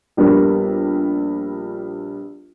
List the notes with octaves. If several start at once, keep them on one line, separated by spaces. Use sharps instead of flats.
A#1 G3 B3 A#4